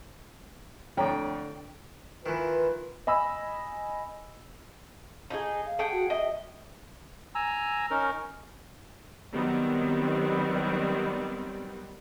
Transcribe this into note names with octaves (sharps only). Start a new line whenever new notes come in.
F2 A2 D3 C#5 G5 A#5
D#3 E3 F4 B4
D#5 G#5 B5 E6
D#4 F4 G#4
F5
G#4 F#5 G5
F#4
D#5 E5
G#5 A#5 E6
C#4 D#4 A#4
D#3 F#3 G3 B3 C4